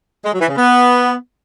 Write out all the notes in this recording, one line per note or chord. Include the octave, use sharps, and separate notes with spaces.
G#3
F#3
E3
C#3
B3